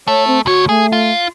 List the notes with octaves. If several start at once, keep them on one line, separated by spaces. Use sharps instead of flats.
A3 C#5
C4
D2 F#4 C#5
A3 G#4
F4